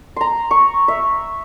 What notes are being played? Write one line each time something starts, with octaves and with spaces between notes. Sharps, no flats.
A#5 C6
C#6
E5